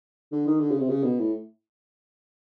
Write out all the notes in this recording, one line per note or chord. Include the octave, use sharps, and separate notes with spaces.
D3
D#3
D3
C#3
C3
C#3
B2
A2